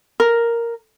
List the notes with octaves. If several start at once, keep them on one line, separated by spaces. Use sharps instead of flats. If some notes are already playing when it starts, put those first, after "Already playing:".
A#4